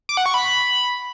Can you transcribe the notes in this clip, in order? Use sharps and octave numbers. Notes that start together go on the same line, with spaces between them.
D6
F#5
C#6
B5